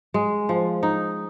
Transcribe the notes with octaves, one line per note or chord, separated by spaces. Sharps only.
G#3
F3
D#4